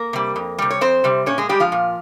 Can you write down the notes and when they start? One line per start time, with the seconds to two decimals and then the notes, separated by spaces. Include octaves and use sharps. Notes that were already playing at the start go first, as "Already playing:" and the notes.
Already playing: A#3 A#4
0.13 C3 G3
0.36 F2
0.58 C3 G3
0.70 C#5
0.81 F2 C4 C5
1.04 C3 G3
1.26 A#2 C#4 C#5
1.38 G#3 G#4
1.49 G3 G#3 G4
1.60 F3 F4
1.72 A#2